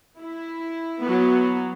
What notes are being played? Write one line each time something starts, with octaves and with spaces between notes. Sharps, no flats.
E4
F#3 B3